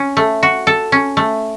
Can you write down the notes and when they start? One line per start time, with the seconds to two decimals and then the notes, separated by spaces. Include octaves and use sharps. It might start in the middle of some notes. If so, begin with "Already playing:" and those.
Already playing: C#4
0.17 A3
0.43 F#4
0.67 A4
0.92 C#4
1.17 A3